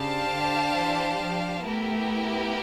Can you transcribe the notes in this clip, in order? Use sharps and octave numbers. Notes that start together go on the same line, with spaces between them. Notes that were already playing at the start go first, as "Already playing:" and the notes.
Already playing: C#3 D4 G4 C5 F5 A5
D3
E3
F3
A3 B3 E4 G4 A#4